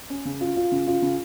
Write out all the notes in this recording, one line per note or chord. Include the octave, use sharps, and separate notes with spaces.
C#4
C#3
F4
F4
C#3
F4
C#3